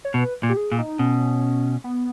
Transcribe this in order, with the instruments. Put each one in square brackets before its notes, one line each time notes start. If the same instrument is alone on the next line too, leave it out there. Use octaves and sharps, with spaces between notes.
[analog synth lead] C#5
[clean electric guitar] B2 [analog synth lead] B4
[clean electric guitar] A#2
[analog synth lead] G4
G#4
[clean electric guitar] A#2
[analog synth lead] D#4
[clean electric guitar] B2 [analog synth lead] C#4
[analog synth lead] B3